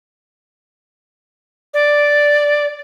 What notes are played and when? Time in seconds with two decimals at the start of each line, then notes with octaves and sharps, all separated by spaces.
1.74 D5